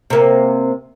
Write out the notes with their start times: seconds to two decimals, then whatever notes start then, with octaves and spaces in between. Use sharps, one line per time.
0.10 C3 A#3